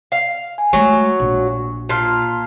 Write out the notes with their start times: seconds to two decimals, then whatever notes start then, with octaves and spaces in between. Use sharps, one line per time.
0.12 F5
0.58 G#5
0.73 F#3 G#3 A3 C#6
1.20 A#1
1.89 A#2 F4 A5 C6 F6